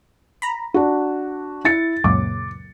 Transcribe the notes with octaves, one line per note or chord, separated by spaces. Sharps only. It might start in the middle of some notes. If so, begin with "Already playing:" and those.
A#5 B5
D4 F#4
E4 A6 C#7
C#2 F#2 A#2 D6